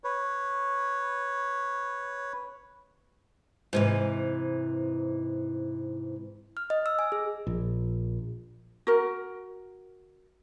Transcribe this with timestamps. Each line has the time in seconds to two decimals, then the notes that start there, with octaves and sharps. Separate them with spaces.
0.04 B4 C#5
3.73 G#2 C3 E3
6.57 F6
6.70 D#5
6.86 E6
6.99 G#5
7.12 G#4
7.47 A#1
8.87 F#4 A#4